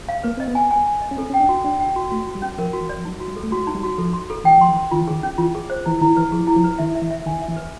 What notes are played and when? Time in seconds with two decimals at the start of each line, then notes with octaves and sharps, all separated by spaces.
0.09 F5
0.23 A#3 B4
0.37 C4 D#5
0.48 B3
0.55 G#5
0.71 G#5
0.86 G#5
1.02 D#5
1.11 C#4
1.17 C4 A4
1.30 C#4 G5
1.40 D4
1.49 F#4
1.64 D4 G5
1.80 G5
1.96 F#4
2.11 A3 F#4
2.27 F#4
2.35 G3
2.42 C#4
2.58 F3 A#4
2.73 F#4
2.81 E3
2.89 D5
2.96 F3
3.05 F#3 D#4
3.20 F#4
3.28 G3
3.36 A4
3.43 A3
3.51 G#3 F#4
3.67 D#4
3.75 G3
3.83 F#4
3.98 F3 A4
4.13 C6
4.30 A4
4.44 E3 G5
4.58 F3 C6
4.68 E3
4.76 C6
4.91 D#3 F4
5.01 E3
5.08 D#3 G#4
5.23 C#4
5.38 E3 F4
5.55 G#4
5.70 C5
5.86 E3 E4
6.01 D#3 E4
6.17 E3 B4
6.32 F3 G#4
6.47 E4
6.56 F3
6.64 B4
6.78 D#3 E5
6.95 E5
7.02 E3
7.11 E5
7.26 D#3 G#5
7.42 E5
7.49 E3
7.56 B4